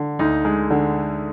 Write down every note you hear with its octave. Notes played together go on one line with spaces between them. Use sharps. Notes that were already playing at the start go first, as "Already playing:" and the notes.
Already playing: D3
D2 D#4
G#3
D3